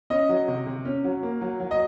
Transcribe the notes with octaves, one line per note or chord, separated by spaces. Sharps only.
C#4 D#5
F#3
C3
C3
C#4
F#3
A#3
F#3
F#3
D#5